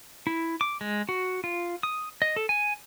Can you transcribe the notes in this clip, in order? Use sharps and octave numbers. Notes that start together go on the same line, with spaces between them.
E4
D6
G#3
F#4
F4
D#6
D#5
A4
G#5